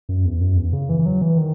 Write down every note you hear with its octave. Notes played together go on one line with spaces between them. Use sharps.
F#2
E2
F#2
E2
C#3
E3
E3
F#3
E3
D#3